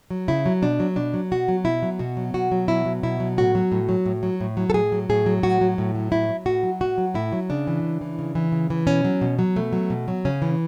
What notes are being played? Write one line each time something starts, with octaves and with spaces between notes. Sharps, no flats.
F#3
C#3 E4
F#3
B2 D4
F#3
B2 D4
F#3
B2 F#4
F#3
B2 E4
F#3
B2 F#4
F#3
B2 F#4
F#3
B2 E4
F#3
B2 E4
F#3
A2 F#4
F#3
A2
F#3
A2
F#3
A2
F#3
A4
A2 G#4
F#3
A2 G#4
F#3
A2 F#4
F#3
A2
F#3
A2 E4
F#3
A2 F#4
F#3
A2 F#4
F#3
A2 E4
F#3
C#3 D4
E3
C#3
E3
C#3
E3
C#3
E3
B2 C#4
F#3
B2
F#3
B2 A3
F#3
B2
F#3
C#3 C#4
E3